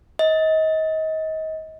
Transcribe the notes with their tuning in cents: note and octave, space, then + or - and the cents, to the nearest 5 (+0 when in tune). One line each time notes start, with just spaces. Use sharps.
D#5 +30